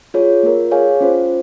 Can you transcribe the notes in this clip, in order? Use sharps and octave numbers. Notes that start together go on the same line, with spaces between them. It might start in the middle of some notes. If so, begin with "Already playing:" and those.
F4 G#4 C#5
A#3 F4 A#4
G#4 C#5 F5 G#5
C#4 F4 C5